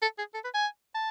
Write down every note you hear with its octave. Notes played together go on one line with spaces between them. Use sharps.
A4
G#4
A4
B4
G#5
A5